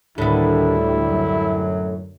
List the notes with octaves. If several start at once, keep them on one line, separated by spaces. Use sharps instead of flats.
D2 A2 D#3 G3 B3 D4 E4
F#2 F#3